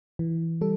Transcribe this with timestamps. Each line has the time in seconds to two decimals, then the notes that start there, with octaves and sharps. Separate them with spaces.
0.19 E3
0.61 G3 A4